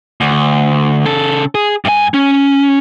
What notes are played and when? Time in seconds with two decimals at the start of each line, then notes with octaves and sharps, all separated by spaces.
0.21 D2
1.06 C#3 A4
1.55 G#4
1.85 G2 G#5
2.14 C#4